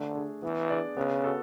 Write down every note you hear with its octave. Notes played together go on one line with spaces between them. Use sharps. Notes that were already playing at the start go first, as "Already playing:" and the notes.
Already playing: D3 A3
D4 G#4
E3 B3
D4 G#4 D5
C#3 B3
F#4 A4